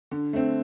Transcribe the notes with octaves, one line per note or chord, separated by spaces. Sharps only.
D3
A3 C4